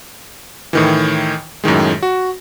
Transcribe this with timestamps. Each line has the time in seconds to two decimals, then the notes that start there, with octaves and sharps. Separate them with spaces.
0.73 A2 D#3 E3
1.64 F#2 A2 D#3 G#3
2.03 F#4